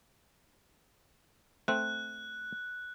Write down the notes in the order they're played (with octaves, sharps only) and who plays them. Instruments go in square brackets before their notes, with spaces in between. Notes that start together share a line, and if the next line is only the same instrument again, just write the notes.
[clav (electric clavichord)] A3 C4 [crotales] F#6